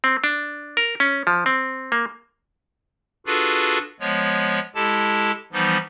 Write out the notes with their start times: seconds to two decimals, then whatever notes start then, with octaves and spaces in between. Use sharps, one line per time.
0.04 C4
0.24 D4
0.77 A#4
1.00 C#4
1.27 F3
1.46 C4
1.92 A#3
3.26 D4 F4 F#4 G#4 A4 B4
4.00 F3 G#3 B3 C#5
4.75 G#3 E4 G4 A4 A5
5.53 E3 F3 G3 B3 D#4